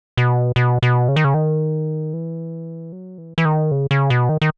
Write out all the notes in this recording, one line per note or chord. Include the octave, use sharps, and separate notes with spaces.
B2
B2
B2
C#3
D#3
C#3
D#3
E3
F#3
E3
E3
D#3
C#3
C#3
B2
D#3
D#3